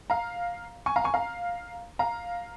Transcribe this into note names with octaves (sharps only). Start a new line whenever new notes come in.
F5 A#5
G#5 C#6
F5 A#5
G#5 C#6
F5 A#5
F5 A#5